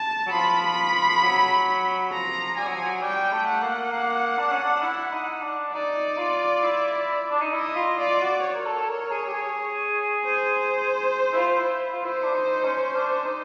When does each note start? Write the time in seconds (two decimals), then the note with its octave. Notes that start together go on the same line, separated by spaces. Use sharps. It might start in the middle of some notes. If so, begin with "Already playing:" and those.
Already playing: A5
0.27 F#3
0.31 F3 B5
1.23 F#3
2.12 F3 A#5
2.57 G3 G#5
2.66 F#3
2.75 F3
2.83 F#3
3.02 G3 G5
3.32 A3
3.48 F#5
3.63 A#3
3.92 A#3
4.38 D4
4.51 C#4
4.63 D4
4.83 E4
5.13 D#4
5.42 D4
5.72 D#4 D5
6.18 F4
6.64 E4
7.31 D4
7.42 D#4
7.53 E4 D#5
7.75 F4
7.98 F4 D5
8.21 F#4
8.44 C#5
8.55 A#4
8.66 A4
8.80 A4
8.89 A#4
9.11 G#4
9.28 G4
9.34 G#4
10.24 C5
11.33 E4
11.36 F4
11.60 E4
11.93 F4
12.04 E4 C5
12.24 D4
12.35 D#4
12.65 C#4
12.95 D4
13.24 D#4